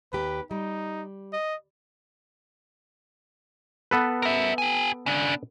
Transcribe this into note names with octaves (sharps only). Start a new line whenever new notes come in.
D#2 G4 B4
G3 D#4
D#5
B3 A4 B4
A#4 E5
G4 G#5
C#3 D4